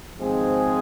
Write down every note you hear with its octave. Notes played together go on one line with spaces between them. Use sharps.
G#1 G#2 F3 G#3 C4 G#4